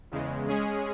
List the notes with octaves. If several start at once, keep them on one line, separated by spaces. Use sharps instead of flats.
E2 C#3 G#3
G#3 C#4 G#4